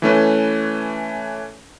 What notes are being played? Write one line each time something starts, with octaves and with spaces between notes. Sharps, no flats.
E3 A3 C#4 B4